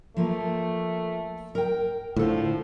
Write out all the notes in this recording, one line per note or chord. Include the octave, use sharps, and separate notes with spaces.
F3 A3 A#3
A#4 G5
A2 D3 F3 A4